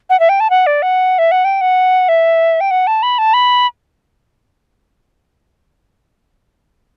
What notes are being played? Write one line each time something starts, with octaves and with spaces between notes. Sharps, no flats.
F#5
E5
G5
A5
F#5
D5
F#5
E5
F#5
G5
F#5
E5
G5
F#5
A5
B5
A5
B5